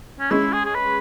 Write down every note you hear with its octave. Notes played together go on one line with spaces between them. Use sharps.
C#4
G#3 C#4 E4
G#4
G#4
B4